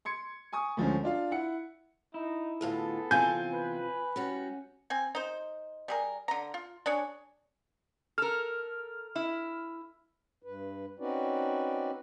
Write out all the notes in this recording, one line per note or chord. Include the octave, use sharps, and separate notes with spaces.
C6 G#6 C#7
G#5 C#6 D#6
D2 F3 G#3 C#4
D4 F4 F5
E4 F#5 C#7
D#4 E4
D2 A2 B3 F4 G#4 A4
E2 C3 C4 F4 G#5 G6
B4
G3 C#4 F#4
C4 G#5
D#4 C5
G3 G#4 A#4
D3 A#5
F4
D4 G#4 C#5
A4 A#4 F6
E4
G2 B4
C4 C#4 D#4 F#4 B4 D5